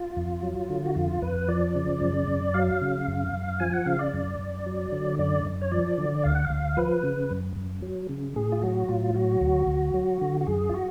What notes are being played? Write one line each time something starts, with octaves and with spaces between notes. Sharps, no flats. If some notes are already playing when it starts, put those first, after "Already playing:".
Already playing: F4
F2
F#3
D3
F#4
F2 F4
F2 B4
F3 D5
C#3
F#2
F#2
F#3 F5
C#3
F#2
F#2
F3 G#5
F#5
C#3 F5
D5
F#2
F#2
F#3
D3
F#2 D5
F#2
C#5
F3 D5
D3
D2 F5
F#5
F5
D2
F3 B4
C#3
F#2
F#2
F#3
C#3
A2 G#4
F4
F#3 F#4
A2 F4
F#3 F#4
D2
D2
F#3
D3
F#4
F#2 G#4
F4
F#4